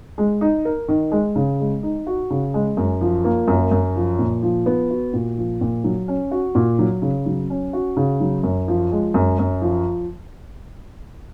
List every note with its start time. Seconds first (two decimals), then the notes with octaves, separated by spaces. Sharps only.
0.18 G#3
0.41 D#4
0.65 A#4
0.88 D#3
1.12 G#3
1.36 C#3
1.60 G#3
1.83 D#4
2.07 F#4
2.30 C#3
2.54 G#3
2.77 F#2
3.01 F3
3.24 A#3
3.48 F#2
3.71 F#2
3.96 F3
4.19 A#2
4.42 F3
4.66 B3
4.90 F#4
5.13 A#2
5.37 F3
5.61 A#2
5.84 F#3
6.08 C#4
6.31 F#4
6.55 A#2
6.79 F#3
7.02 C#3
7.26 F#3
7.50 C#4
7.73 F#4
7.97 C#3
8.20 F#3
8.43 F#2
8.68 F3
8.92 G#3
9.14 F#2
9.39 F#2
9.62 F3